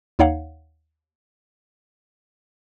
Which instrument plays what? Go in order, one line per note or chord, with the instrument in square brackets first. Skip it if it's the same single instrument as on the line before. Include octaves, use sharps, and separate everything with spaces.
[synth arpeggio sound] D#2 D#4 C#5 F5 F#5